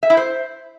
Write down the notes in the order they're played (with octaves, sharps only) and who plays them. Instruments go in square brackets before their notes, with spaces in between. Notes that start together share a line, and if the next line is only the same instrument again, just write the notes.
[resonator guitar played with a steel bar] E5
E4
C5